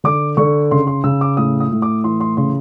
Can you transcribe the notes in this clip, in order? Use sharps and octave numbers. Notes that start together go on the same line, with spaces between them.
D3 D6
D3 C#6
C#3 C6
C6
C#3 E6
D6
A2 D#6
D#6
A2
D6
E3 C6
C6
C#3 C6